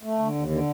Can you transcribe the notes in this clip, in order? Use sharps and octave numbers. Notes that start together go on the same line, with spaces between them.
A3
D3
D#2
D3